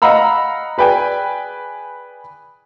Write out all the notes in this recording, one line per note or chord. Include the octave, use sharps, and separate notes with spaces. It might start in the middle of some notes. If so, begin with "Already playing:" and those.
D#5 F5 F#5 A#5 B5 E6
G#4 B4 D5 G5 G#5